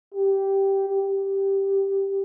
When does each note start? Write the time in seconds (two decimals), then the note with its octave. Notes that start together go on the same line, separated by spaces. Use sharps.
0.14 G4
0.89 G4